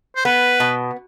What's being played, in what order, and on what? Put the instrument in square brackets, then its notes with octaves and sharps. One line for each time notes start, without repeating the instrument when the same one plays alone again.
[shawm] C5
[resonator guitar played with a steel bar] B3 [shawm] B4
[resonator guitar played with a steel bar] B2